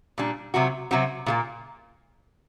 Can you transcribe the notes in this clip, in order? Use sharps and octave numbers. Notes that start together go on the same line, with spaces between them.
A#2 G3 D4
C3 F#3 C4 F#4
C3 F#3 C4 F#4
A#2 G3 A#3